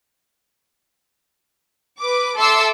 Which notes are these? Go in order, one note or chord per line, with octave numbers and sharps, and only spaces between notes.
B4 D6
A4 E5 C6 D6 E6